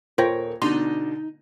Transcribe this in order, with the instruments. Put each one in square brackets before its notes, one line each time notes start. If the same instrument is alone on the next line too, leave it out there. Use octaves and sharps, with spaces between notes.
[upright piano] D#1 C#5 A#6 [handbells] F4 C5 G5 [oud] A#4
[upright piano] B2 D3 D4 [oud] D#4 [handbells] C6